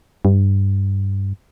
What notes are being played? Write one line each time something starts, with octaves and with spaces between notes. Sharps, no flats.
G2